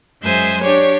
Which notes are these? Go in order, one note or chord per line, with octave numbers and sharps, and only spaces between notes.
F#2 G#3 C5 E5 G#5
D4 G4 C#5